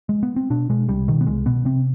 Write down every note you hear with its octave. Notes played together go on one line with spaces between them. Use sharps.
G#3
B3
C4
B2 D4
B2 G#3
C2 G3
B2 D#3
B3
C2 G#3
B2 B3
C3 C4